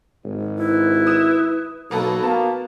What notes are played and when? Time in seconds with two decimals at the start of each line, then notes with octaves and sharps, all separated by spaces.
0.25 G#1
0.58 E4 B4
1.07 D#6 E7
1.91 B1 A#3 B3 F#4 A4
2.23 A#3 B3 A5